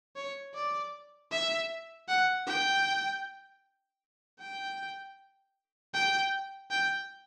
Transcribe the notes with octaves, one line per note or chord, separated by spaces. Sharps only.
C#5
D5
E5
F#5
G5
G5
G5
G5